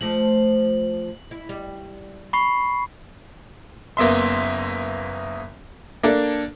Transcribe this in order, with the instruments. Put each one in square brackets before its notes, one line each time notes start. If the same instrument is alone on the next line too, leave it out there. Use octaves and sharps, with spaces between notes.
[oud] F3 A3 [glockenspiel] F#7
[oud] E4
G3
[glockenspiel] B5 C#6 C7
[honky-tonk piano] F#1 A#3 B3 E5 C6
A#3 D4 A4